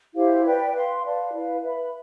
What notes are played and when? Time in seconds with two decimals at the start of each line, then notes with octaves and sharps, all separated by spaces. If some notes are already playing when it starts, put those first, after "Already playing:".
0.15 E4 G4 C5 F5
0.44 B4 D5 G5
0.73 B4 F5 C6
1.02 B4 D5 F5 A5
1.32 E4 B4 F5
1.61 B4 E5 B5